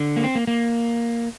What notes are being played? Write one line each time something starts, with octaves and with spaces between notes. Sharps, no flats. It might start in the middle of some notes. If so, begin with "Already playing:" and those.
Already playing: D3
A#3
C4
A#3
A#3